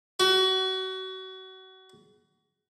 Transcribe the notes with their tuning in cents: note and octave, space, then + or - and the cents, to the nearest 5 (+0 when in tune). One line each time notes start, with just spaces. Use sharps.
F#4 +30